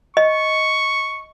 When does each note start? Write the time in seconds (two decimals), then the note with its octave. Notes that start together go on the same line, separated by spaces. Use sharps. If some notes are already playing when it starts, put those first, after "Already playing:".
0.17 D#5 C#6